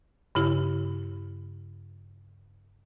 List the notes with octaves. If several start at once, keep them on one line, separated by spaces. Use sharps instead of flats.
G2 C#3 E4